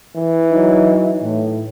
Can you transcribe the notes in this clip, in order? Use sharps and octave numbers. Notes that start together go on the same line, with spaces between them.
E3
F#3 D#4
A2